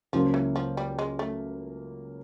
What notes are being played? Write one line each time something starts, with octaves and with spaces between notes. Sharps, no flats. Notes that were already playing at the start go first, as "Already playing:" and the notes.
C#2 C#3 F3 F#3 A#3
E3
F3
G3
G#3
A3